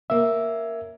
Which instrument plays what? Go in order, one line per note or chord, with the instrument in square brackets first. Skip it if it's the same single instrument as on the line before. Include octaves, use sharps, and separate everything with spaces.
[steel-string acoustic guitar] A#3 C#4 [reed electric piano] E5